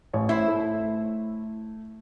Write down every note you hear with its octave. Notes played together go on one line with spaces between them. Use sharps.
A1 C#5
E4 C5
A3